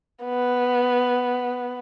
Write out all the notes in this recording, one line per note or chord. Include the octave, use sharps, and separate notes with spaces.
B3